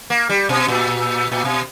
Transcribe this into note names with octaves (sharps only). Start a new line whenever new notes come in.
A#3
G3
B2
A#2
A#2
B2